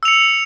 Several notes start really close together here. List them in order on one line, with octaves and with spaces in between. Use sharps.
E6 F7 C#7